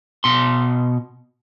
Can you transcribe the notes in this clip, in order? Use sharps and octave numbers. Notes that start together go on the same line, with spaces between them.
B2 C6